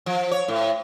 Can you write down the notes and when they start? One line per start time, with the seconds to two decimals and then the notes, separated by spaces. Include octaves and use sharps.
0.06 F3
0.31 C#5
0.48 A2